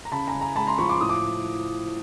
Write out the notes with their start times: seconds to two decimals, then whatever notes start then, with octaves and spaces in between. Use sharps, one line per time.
0.05 A#5
0.12 C#3 A5 B5
0.28 G#5 A#5
0.35 C#3
0.41 G#5 A#5
0.56 G#3 A5 B5
0.67 A#5 C6
0.78 F3 B5 C#6
0.89 C6 D6
1.01 A2 D#6
1.09 D6